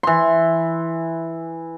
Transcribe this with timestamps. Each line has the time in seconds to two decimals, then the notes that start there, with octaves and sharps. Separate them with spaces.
0.03 E3 C6